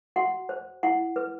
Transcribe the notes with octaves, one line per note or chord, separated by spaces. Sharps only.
F#4 F#5
C5
E4 F#5
B4